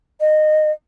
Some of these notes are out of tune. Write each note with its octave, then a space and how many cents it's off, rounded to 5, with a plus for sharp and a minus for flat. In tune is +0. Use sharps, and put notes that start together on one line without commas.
D#5 -15